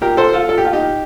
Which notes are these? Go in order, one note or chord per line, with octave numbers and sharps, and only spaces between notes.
A#2 G4 A#4
A4 C5
F4 A4
A#2 A4
G4
F4
D#4 G4